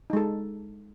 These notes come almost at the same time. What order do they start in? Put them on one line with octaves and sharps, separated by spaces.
D#4 G#3 A4